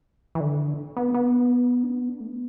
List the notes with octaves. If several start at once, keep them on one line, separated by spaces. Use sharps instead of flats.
E3
D3
B3
B3
D4
B3
D4
A3
B3